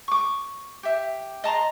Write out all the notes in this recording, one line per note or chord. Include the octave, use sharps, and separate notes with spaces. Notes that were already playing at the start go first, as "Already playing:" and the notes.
C#6 D6
G4 E5
D#5 A5 A#5 C6